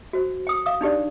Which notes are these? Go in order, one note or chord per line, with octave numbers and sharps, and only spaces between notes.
F#4 C5
G5 D#6
F5 D#6
D4 D#4 G4 D5